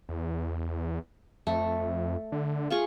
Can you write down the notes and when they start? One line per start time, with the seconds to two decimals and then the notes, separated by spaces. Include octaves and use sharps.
0.09 E2
1.47 F2 A3
2.32 D3
2.70 F4 G#4 C#6